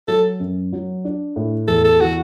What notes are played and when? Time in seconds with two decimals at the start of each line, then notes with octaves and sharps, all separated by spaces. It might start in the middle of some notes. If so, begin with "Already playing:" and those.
0.08 F#3 A4
0.40 F#2
0.73 F#3
1.05 D4
1.36 A2
1.68 E2 A4
1.84 A4
2.01 E3 F#4